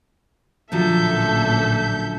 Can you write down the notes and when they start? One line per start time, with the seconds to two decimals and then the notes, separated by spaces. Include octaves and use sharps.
0.72 A1 A#2 D3 F3 F#3 A4 E5 G6